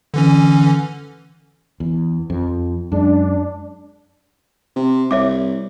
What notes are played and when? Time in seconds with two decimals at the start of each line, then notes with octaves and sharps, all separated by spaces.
0.14 D3 E3 C#4
1.80 E2
2.30 F2
2.92 F#2 G#3 D4
4.76 C3
5.11 C2 C#5 E5 D6